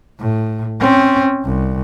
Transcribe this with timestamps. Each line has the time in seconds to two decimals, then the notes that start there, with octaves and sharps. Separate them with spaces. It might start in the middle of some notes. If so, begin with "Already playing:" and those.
0.20 A2
0.80 C4 C#4
1.44 C2